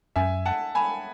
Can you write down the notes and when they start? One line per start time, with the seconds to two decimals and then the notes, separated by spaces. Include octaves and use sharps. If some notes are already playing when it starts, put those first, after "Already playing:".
0.16 F#2 E5 G#5
0.45 F#5 A5
0.75 G#5 B5